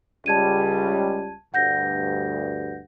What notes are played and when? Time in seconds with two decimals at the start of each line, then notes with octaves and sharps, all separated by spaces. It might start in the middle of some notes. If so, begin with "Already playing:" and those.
0.26 C#2 G3 A5 G#6 D#7
1.54 D2 G2 F#5 G6 A#6